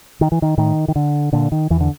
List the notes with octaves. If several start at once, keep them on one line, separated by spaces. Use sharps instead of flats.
D#3
E3
D#3
A2 D#3
D#3
D3
A#2 D3
D#3
E2 E3
D3